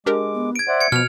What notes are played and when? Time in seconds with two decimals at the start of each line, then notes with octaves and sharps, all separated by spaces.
0.06 G#3 D4 G4 A#4 D6
0.34 B3
0.56 G#6 D7
0.68 C5 D5 E5 F#5
0.81 G#6 C#7
0.92 B2 F3 B3 F6 F7